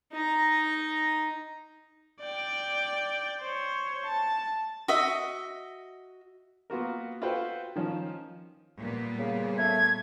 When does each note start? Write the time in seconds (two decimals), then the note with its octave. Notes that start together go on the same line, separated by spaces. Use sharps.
0.12 D#4 A#5
2.20 D5 G5
3.41 C5 C#5
4.06 A5
4.88 F#4 D#5 E5
6.70 A#3 B3 F4 F#4 A#4
7.22 F4 F#4 A4 B4 C5 G5
7.76 D#3 F3 C#4
8.78 A#2 G3 B3
9.19 C#3
9.58 A3 G#6